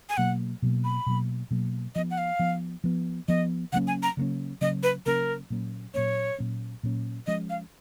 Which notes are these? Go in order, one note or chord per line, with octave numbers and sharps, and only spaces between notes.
G#5
B2 F#3 A#3 F#5
B2 F#3 A#3
B5
B2 F#3 A#3
B2 F#3 A#3
F3 B3 D#5
F#5
F5
F3 B3
F3 B3
F3 B3 D#5
C#3 F#3 A#3 C#4 F#5
G#5
A#5
C#3 F#3 A#3 C#4
C#3 F#3 A#3 C#4 D#5
B4
C#3 F#3 A#3 C#4 A#4
A#2 F#3 A#3 C#4
A#2 F#3 A#3 C#4 C#5
A#2 F#3 A#3 C#4
A#2 F#3 A#3 C#4
F3 G#3 C#4 D#5
F5